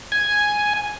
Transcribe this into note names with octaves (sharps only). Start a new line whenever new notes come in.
G#5